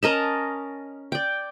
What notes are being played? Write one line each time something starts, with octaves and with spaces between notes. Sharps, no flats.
C#4 A#4 D#5 A5
D5 G5